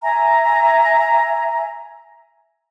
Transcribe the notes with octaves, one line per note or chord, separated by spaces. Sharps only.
E5 G#5 A#5